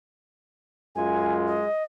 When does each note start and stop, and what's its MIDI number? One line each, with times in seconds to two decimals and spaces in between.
0.95 1.67 42
0.95 1.67 56
0.95 1.67 65
0.95 1.37 80
1.48 1.83 75